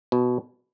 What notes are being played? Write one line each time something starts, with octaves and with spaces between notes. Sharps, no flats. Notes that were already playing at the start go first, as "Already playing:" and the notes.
B2